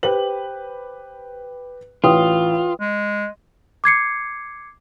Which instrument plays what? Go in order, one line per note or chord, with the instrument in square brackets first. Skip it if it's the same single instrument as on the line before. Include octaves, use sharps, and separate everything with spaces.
[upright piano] G4 B4 F#7 [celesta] C5
[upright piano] A1 [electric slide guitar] F4 [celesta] B4 G5 D#6
[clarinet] G#3
[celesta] D6 G#6 C7 C#7